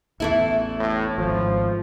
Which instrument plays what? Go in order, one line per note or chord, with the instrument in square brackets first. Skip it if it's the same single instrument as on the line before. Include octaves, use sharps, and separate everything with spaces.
[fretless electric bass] A1 E2 [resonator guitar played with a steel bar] E3 A3 E4
[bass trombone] A2
[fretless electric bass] G#1 [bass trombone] F3